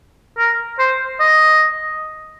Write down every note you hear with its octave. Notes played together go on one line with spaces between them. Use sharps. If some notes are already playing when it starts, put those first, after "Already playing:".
A#4
C5
D#5